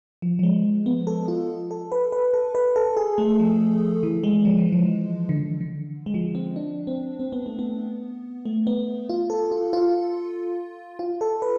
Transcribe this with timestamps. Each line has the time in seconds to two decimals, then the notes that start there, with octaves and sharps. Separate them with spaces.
0.22 F3
0.39 F3
0.43 G#3
0.86 B3
1.07 A4
1.28 F4
1.71 A4
1.92 B4
2.12 B4
2.34 A4
2.55 B4
2.76 A4
2.97 G#4
3.18 A3
3.40 F3
4.03 E3
4.24 G#3
4.45 F3
4.58 E3
4.72 F3
5.29 D3
5.61 D3
6.06 G#3
6.14 F3
6.35 C4
6.56 D4
6.87 C4
7.19 C4
7.32 B3
7.46 A3
7.59 B3
8.46 A3
8.67 B3
9.09 F4
9.30 A4
9.52 F4
9.73 F4
10.99 F4
11.21 A4
11.42 B4